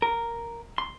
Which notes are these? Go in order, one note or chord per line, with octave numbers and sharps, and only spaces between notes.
A#4
C6